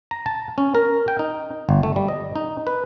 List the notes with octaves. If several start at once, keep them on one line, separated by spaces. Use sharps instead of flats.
A#5
A5
C#4
A#4
G5
D#4
G1
A3
G3
D#5
D#4
B4